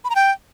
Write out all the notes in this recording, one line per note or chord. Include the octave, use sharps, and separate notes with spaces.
B5
A#5
G5